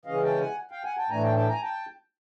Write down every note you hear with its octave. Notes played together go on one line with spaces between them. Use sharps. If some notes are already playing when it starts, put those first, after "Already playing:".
C#3 E3 G#3 C#4 D#5 F5
G5 A5
F#5 G#5
F5 G5
F#5 G#5
G5 A5
A2 E3 A3 D4 G#5 A#5
G5 A5
G5 A5
G#5 A#5
G5 A5